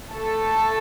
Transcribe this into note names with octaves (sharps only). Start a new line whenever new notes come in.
A3 A4